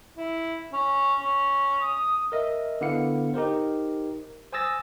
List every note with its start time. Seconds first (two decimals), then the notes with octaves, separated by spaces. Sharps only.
0.17 E4
0.73 C#4
1.19 C#4
1.82 D#6
2.32 A#4 D#5 E5
2.81 D3 B3 E4 F5 C#7
3.34 D#4 G4 A#4 C5
4.52 C5 G#5 D#6 E6 A6 A#6